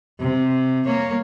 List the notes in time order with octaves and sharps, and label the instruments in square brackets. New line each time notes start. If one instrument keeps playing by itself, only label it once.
[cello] C3
A#3 C#5